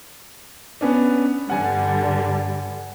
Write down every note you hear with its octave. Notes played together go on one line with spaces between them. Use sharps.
B3 C#4 D4
G2 D3 G3 F#5 G#5